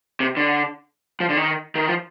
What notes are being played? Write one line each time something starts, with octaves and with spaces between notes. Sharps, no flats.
C3
D3
F3
D3
D#3
D#3
F3